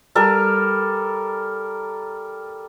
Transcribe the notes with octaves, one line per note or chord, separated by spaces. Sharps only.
G3 A4 A#4